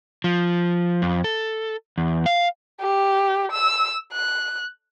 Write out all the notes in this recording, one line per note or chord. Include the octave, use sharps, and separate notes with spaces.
F3
F2
A4
E2
F5
G4
E6
F#6